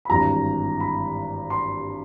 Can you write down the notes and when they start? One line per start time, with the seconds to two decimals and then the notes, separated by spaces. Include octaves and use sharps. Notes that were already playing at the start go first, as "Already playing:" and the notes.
0.05 B5
0.09 G#1 G2 E3 A#5
0.80 B5
1.50 C6